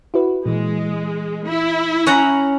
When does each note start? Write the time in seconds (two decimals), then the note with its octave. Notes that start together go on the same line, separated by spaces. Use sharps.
0.14 E4 F#4 B4
0.46 A#2 E3 G#3
1.46 E4
2.06 C#4 F#5 A#5